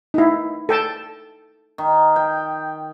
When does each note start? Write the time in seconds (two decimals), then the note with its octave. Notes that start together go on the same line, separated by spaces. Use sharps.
0.14 D#4 E4
0.69 A4 G5 A5
1.78 D#3
2.16 G5